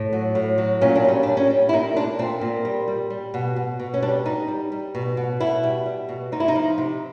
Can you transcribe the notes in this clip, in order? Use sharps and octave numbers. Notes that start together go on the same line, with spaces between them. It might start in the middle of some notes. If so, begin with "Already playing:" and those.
Already playing: A2
F#3
A2
F#3
A#2 C#4
D4
G3 C#4
G3 D4
C#4
G3
E4
A#2 D#4
A#2 D4
A#2 C4
A#2
G3
G3
G3
B2
B2
B2
C#4
G3 D4
G3 D#4
G3
G3
B2
B2
B2 E4
G3
G3
B2
C3 D#4
E4
D#4
F3
C3